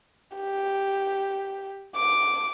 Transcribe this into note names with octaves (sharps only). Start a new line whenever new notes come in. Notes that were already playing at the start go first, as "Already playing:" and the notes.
G4
D6